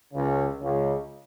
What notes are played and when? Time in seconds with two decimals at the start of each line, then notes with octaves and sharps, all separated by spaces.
0.13 C#2 C#3
0.60 C#2 C#3